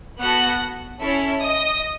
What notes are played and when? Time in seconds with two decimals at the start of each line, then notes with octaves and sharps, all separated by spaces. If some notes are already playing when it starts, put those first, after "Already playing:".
0.19 B3 F#4 A4 F#5 F#6
1.01 C#4 E4 A4
1.42 D#5 D#6